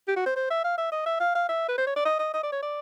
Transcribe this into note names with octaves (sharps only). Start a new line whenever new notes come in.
G4
F#4
C5
C5
E5
F5
E5
D#5
E5
F5
F5
E5
B4
C5
C#5
D5
D#5
D#5
D#5
D5
C#5
D5